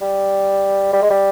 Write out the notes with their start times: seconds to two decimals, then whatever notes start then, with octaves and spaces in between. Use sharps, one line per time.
0.02 G3
0.93 G3
1.02 G#3
1.11 G3